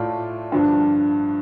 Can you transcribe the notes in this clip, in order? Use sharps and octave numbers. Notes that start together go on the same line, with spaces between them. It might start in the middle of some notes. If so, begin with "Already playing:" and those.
Already playing: A2 A3 F4 D5
G2 D3 F3 D4